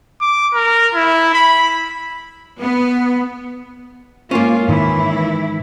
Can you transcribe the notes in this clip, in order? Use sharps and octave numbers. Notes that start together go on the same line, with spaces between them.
D6
A#4
E4
B5
B3
G#2 A#3 C#4 F4
G#2 D#3 E3 E4